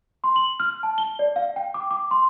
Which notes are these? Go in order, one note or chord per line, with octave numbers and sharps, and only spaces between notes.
C6
F#7
F6
A5
G7
D5
F5
G5
D6
D6
C6